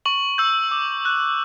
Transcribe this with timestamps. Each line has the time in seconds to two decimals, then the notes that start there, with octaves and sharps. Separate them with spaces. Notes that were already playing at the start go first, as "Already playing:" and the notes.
0.05 C#6 F#7
0.38 E6 G6
0.71 D6
1.05 F#6